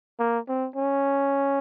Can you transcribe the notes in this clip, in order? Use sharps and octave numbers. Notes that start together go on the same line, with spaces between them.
A#3
C4
C#4